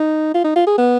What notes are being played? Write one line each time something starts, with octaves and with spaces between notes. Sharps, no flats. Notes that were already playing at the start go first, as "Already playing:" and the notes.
Already playing: D#4
F4
D#4
F4
G#4
B3